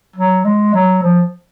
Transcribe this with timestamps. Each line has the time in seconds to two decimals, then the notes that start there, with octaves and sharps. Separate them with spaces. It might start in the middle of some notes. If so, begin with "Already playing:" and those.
0.16 F#3
0.45 G#3
0.74 F#3
1.03 F3